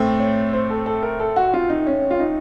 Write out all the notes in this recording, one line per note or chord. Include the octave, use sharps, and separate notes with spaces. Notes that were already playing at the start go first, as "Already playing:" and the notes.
Already playing: A2 A3 C4
C#5
C5
A4
A4
A#4
A4
F#4
F4
D#4
C#4
F4
D#4